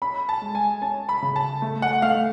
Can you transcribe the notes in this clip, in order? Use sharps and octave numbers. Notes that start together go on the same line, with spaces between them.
C#4 B5
A5
G#3
G#5
C#4 A5
B5
C#3
A5
A3
F#5
A3 F5